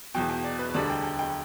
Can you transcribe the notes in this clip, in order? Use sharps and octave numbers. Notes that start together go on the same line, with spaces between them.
E1 E2 B2 G5
G5
D5
B4
B4
E1 D2 D3 G3 D5
G5
G5
G5